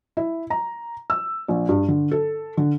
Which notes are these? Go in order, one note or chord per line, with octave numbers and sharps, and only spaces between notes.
E4
A#5
E6
A#1
G2
D3
A4
D3